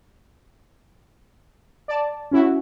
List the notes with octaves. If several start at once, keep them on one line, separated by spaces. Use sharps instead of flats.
D5 A5
C#4 E4 F#4